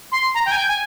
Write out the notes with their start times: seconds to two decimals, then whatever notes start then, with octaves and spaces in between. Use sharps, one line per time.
0.12 C6
0.34 A#5
0.46 G5
0.51 G#5
0.57 G5
0.68 G#5